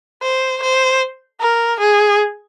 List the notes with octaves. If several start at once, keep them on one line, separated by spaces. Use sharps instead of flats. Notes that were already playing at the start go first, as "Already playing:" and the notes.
C5
C5
A#4
G#4